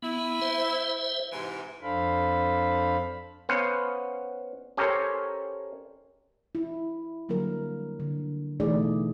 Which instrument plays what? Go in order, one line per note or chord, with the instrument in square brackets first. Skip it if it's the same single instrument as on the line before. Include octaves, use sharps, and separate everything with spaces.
[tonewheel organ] B3 [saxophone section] E4
[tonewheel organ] C5 E5
[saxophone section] G#2 C3 E3
[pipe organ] F2 D4 A4 C5 F5 B5
[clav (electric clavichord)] B3 C#4 C5 F5 F#5
C#4 G4 A4 A#4 C5 C#5
[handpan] E4
D3 F#3 G3 A#3 A#4
D3
B2 E3 A3 D#4 G#4 D5